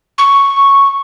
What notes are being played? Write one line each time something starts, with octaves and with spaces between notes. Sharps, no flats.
C#6